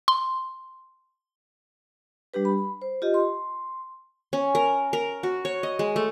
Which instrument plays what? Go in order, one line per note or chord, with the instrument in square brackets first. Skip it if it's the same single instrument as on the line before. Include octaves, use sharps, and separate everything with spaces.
[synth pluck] C6
[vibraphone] G3 D4 G4 B4
B5
C5
F4 G4 D#5
C6
[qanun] C#4
A#4
A#4
F#4
C#5
D#5
G#3
A3